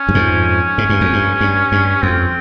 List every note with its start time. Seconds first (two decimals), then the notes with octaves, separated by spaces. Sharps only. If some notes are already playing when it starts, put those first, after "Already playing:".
Already playing: C#4
0.09 G2
0.14 F2 G#2
0.78 G#2
0.89 G2
1.01 F2
1.13 G2
1.41 G2
1.72 G2
2.03 F2 C4